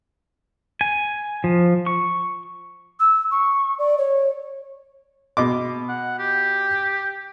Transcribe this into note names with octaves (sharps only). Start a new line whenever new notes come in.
G#5
F3
C#6
E6
C#6
D5
C#5
B2 D#5 D6
F#5
G4